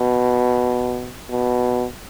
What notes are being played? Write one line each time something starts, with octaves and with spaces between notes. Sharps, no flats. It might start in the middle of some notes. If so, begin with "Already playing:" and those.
Already playing: B2
B2